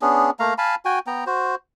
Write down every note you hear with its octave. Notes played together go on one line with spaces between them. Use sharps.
B3 C#4 D4 G#4
A3 A#3 F5 A#5
F5 G#5 A5 B5
F#4 G5 G#5
B3 G5 A#5
F#4 C5